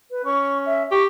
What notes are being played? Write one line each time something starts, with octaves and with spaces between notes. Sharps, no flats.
B4
C#4 C#6
E5
G4 C#6